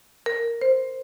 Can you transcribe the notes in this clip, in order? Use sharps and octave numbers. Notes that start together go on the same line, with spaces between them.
A#4
C5